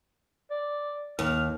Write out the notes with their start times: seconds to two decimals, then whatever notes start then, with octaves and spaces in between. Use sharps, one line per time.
0.50 D5
1.19 D#2 F6